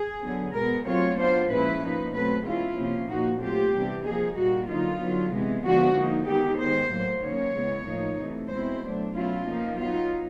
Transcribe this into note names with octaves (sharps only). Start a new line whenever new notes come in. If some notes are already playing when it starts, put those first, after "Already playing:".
Already playing: G#4
D3 F#3 B3
B2 G#3 B3 A#4
F#3 A3 C4 F4 C#5
F#3 B3 D4 F4 C5
A#2 F3 G#3 C#4 E4 B4
A#2 F3 A#3 D#4
B2 F#3 A3 C4 B4
E3 G#3 C#4 E4 F4
C3 F3 A#3 C#4
A#2 F3 A#3 D#4 F#4
F#3 A3 C4 F4 G4
C3 E3 G3 B3 D4
F3 A#3 D#4 G#4
A#2 G3 A#3 F#4
D3 F#3 A#3 D#4 F4
D3 F#3 B3
C3 E3 G#3 B3
D3 F3 G#3 B3 D4 F#4
F3 A#3 D#4
D#3 G#3 B3 D#4 G4
D#3 G#3 B3 C5
A2 F#3 A#3
D#3 F#3 A#3 C#4 C#5
C#3 E3 G#3 B3
A2 F3 A#3 D#4
C3 E3 A3
B2 G#3 C4 E4 C5
F#3 A3 D4
B2 F#3 A3 C#4 E4 F4
F3 A#3 D#4
F#3 B3 D#4 F4